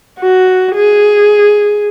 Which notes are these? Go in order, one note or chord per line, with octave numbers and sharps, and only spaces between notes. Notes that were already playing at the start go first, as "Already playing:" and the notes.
F#4
G#4